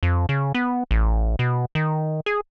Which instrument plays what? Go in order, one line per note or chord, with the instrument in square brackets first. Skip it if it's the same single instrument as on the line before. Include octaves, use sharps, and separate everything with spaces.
[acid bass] F2
C#3
B3
A1
B2
D#3
G#4